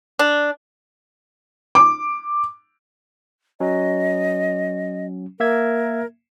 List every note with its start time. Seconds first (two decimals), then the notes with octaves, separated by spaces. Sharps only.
0.19 D4
1.75 D6
3.60 F#3 C#4 D#5
5.40 A#3 A#4 E5 G#6